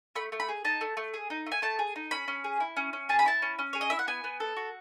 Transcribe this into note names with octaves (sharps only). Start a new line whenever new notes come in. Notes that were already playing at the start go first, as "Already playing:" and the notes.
A3 B5
A3
B5
G#4
D#4 A5
A3
A3
G#4
D#4
A3
G#5
A3 A5
G#4
D#4
C#4 B5
C#4
G#4
E4
C#4
C#4
G#4 A5
B5
E4 A5
C#4
C#4
G#4 C#5
D#5
E4 E5
F#5
B3 G#5
B3
A4
F#4